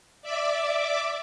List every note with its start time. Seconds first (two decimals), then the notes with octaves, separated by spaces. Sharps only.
0.22 D5 E5 D6